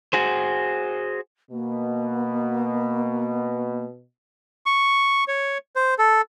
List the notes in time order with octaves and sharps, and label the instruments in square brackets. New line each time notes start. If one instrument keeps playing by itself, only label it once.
[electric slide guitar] F#4 G#4 C5
[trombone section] B2 [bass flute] A#3
[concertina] C#6
C#5
C5
A4